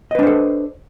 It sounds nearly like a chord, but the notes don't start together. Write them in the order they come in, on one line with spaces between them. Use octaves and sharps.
D#5 B4 D4 C5 A4